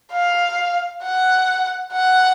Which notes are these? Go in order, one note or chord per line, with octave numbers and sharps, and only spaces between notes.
F5
F#5
F#5